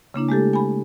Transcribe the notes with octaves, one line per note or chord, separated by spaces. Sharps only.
C#3 A#3 D4 E4
G#3 A3 G4 A4
G#5 B5